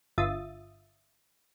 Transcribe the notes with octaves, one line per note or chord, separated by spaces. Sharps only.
G1 F4 E5 D#6 A6